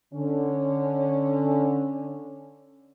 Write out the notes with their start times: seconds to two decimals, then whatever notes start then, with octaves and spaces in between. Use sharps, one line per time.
0.14 D3 C#4